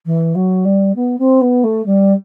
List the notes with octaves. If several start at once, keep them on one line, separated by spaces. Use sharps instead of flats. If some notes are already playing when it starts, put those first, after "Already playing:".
E3
F#3
G3
B3
C4
B3
A3
G3